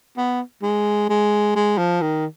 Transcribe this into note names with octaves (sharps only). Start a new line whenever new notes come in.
B3
G#3
G#3
G#3
F3
D#3